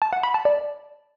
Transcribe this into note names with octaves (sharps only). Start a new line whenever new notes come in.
A5
F#5
B5
A5
D5